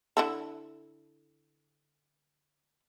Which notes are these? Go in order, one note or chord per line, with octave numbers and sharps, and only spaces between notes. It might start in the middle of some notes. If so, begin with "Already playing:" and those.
D3 E4 A4